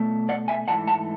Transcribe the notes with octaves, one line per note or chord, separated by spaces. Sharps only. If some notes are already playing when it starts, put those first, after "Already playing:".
Already playing: B2 A3
D5 F#5
E5 G#5
G#2 E3 A3 F#5 A5
F#5 A5